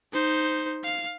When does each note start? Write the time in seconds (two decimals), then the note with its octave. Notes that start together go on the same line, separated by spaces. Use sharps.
0.12 D#4 C5
0.84 F5